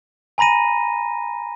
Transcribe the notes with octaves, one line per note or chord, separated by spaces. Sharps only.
G#5 A#5 B5 A#6 D#7